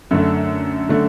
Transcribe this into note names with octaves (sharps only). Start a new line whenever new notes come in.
F#2 D3 A3
D3 A3